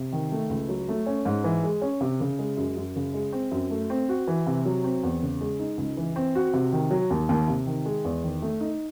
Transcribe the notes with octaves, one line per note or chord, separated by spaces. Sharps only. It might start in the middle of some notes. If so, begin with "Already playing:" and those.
Already playing: C3
D#3
A3
C#2
F#3
A3
C#4
G#2
E3
G#3
C#4
C3
C#3
G#3
F#2
F#2
C#3
G#3
C4
F#2
A3
C4
F#4
E3
C3
F#3
C4
E2
C#3
G#3
D#4
C#2
E3
C4
F#4
C3
D#3
F#3
D#2
D#2
C3
D#3
G#3
E2
D#3
A3
D#4